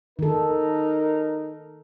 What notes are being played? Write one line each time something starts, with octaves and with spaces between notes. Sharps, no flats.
D#3 D#4 A4 A#4